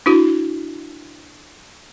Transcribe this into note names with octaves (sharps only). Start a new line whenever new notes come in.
D4 E4 F#4